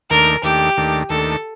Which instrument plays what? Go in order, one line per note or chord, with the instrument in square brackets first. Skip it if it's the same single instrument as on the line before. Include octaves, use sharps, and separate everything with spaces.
[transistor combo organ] D#2 D#3 A3 D4 [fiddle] A#4
[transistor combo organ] D#2 D#3 A3 D4 [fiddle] G4
[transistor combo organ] D#2 D#3 A3 D4
[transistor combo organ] D#2 D#3 A3 D4 [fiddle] A4